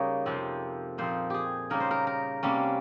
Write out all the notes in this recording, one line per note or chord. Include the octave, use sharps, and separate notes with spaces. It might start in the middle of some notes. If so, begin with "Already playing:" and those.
Already playing: C#3 G3 A#3 D#4 C#5
F2 C3 F3 C4
A#2 F3 C4 D#4 C5
G4 G#4
C#3 G3 A#3 D#4 A#4
C5
A#4
A#4
C3 G3 A#3 C#4